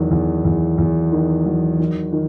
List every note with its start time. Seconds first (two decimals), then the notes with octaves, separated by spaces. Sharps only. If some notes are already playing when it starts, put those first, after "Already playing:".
Already playing: E2 D#3 F#3
0.11 E2
0.45 E2
0.78 E2
1.12 D#3
1.45 F#3
1.79 D#3
2.13 D#3